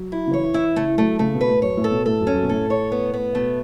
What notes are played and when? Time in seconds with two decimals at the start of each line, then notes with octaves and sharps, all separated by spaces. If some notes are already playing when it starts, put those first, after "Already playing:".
Already playing: F#3
0.12 E4
0.27 C#3
0.33 E3 C#5
0.54 E4
0.76 C#3 A3
0.98 F#3 A3
1.19 C#3 A3
1.34 B2
1.41 B4
1.48 A2
1.62 F#2 C#5
1.77 A2
1.84 A4
1.91 B2
2.06 A2 A4
2.20 F#2
2.27 C#4
2.34 F#2
2.43 B2
2.49 A2 A4
2.70 C#5
2.92 B3
3.14 B3
3.35 B2 A3